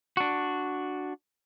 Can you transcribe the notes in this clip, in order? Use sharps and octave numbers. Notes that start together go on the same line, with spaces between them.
D4 F#4